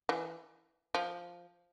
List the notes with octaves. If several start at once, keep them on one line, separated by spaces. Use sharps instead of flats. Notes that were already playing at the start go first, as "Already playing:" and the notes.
E3
F3